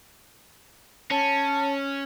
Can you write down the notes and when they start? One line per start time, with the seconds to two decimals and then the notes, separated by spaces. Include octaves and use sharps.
1.11 C#4 A5